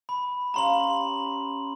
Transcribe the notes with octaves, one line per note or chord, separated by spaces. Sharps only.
B5
C#4 G4 F5 A#5 C6 F#7